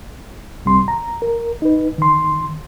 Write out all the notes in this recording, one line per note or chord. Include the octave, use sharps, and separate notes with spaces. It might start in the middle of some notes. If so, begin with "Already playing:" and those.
C2 G3 C4 C6
A#5
A#4
D#4 B4
D#3 C6